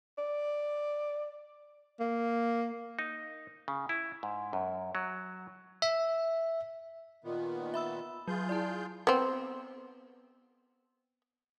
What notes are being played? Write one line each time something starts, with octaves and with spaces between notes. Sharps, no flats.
D5
A#3
D#4
C#3
E4
G#2
F#2
F#3
E5
A#2 D#3 B3 F4
E5 B5 E6
F#3 F4 G#4 G6
E4 D5 A5
B3 C4